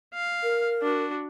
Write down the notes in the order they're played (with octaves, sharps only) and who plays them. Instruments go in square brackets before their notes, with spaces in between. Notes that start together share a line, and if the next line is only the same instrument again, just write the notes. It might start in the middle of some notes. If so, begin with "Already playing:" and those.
[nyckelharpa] F5
[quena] A#4
[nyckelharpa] D4 F#4